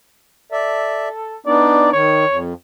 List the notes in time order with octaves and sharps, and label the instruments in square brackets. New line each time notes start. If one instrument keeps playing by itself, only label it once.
[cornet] A4 [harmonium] D5 E5
[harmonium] B3 D4 D#4 [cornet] D5
[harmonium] D#3 [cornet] C#5
[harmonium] F2